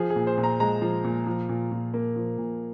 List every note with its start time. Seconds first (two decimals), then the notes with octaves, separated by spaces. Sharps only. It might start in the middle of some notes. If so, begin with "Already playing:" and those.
Already playing: F3 G#4
0.10 G#4
0.16 A#2
0.27 C5
0.37 A#2
0.44 A#5
0.60 G#3 A#5
0.82 F3
1.04 A#2
1.27 F3
1.49 A#2
1.72 A#2
1.94 A#3
2.16 F3
2.38 A#2